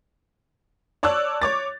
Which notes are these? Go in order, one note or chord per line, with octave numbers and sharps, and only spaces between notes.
C#5 D5 A5 D6 E6 F#6
C#5 D6 A6